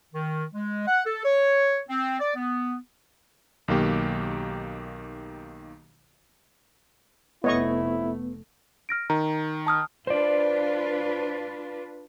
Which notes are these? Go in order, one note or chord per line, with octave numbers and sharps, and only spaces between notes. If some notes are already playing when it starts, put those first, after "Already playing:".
D#3
G#3
F#5
A4
C#5
C4
D5
B3
B1 D#3 A#3 G4
F1 A3 B3 E4 C#5 D#5 C#6
F6 A#6 D7
D#3 A#5
A5 D#6 F6
D4 F4 B4 C5 D5